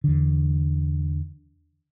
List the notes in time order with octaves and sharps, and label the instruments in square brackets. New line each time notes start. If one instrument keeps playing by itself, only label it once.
[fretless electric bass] E2 D3